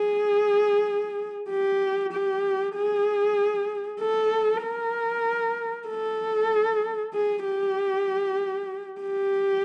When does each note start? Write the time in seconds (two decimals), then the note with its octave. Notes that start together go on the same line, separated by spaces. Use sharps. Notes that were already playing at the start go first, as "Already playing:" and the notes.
Already playing: G#4
1.50 G4
2.12 G4
2.75 G#4
4.00 A4
4.63 A#4
5.88 A4
7.13 G#4
7.45 G4
9.01 G4